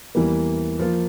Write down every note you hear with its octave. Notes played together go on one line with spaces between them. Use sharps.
E2 E3 G3 A#3
F3 A#3 F4